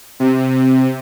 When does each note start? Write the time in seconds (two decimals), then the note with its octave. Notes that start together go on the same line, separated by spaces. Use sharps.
0.20 C3